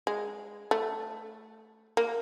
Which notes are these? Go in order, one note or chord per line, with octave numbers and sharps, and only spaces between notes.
G#3
A3
A#3